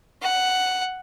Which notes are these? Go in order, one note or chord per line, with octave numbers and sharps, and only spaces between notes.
F#5